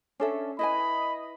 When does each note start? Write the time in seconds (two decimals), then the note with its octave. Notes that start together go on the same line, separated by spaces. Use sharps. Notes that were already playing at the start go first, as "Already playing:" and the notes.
0.20 C#4 D4 A4 E5
0.59 E4 B4 D#5 G#5 B5